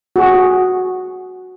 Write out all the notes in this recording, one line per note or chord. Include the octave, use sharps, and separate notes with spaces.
F#4 G#4